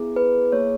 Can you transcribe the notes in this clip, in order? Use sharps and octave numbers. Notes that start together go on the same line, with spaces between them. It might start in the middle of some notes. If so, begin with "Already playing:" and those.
Already playing: B3 E4 G#4
B4
A#3 E4 G#4 C#5